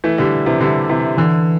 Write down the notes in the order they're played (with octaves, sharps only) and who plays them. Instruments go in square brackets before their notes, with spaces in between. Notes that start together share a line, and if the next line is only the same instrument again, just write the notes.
[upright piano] E3 A3
D3 G3
C3 E3
D3 G3
C3 E3
[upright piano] D3 [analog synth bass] E3